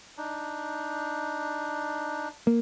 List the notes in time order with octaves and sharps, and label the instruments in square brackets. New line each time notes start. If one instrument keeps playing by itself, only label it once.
[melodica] D4 D#4
[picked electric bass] A#3